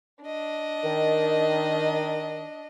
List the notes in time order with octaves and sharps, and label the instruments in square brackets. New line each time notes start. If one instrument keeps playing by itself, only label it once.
[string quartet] D4 D#5
[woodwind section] D#3